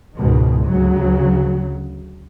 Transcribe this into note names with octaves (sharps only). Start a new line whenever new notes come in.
C#2 G#2 B2 D#3
D2 C#3 F#3